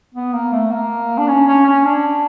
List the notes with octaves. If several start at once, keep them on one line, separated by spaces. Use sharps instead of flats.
B3
A#3
A3
A#3
D4
C#4
C#4
C#4
D4